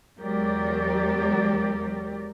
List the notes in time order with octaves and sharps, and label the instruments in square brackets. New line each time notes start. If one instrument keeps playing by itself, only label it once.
[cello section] E2 F#3 G#3 G4 A#4 D5